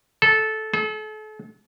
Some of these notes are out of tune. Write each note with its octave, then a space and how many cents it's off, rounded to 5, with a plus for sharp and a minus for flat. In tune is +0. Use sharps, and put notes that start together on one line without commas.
A4 -15
A4 -40